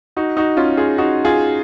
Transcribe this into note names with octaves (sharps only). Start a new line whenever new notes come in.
D#4 F#4
D#4 F#4
C#4 F4
F4 G#4
D#4 F#4
F4 G#4